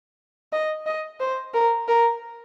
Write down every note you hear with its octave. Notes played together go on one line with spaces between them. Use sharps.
D#5
D#5
C5
A#4
A#4